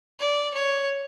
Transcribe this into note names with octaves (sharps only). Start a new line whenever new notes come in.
D5
C#5